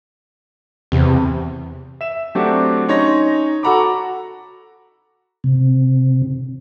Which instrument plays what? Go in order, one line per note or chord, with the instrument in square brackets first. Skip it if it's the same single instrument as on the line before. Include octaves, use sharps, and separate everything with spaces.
[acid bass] E2 [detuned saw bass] C3
[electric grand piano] E5 E7
F#3 A3 C4 D4 F#4 G4
C#4 D#4 C#5 C6 A#6
F#4 A4 F#5 A#5 B5 D6
[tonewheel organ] C3